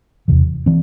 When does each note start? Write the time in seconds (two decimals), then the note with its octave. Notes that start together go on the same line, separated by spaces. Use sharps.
0.28 E2 C3 E3
0.66 E3 C4